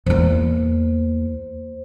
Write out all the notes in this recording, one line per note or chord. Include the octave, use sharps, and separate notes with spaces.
E2 A#3 C5